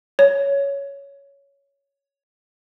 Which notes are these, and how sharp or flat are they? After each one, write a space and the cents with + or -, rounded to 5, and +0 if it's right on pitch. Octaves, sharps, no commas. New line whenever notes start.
C#5 +10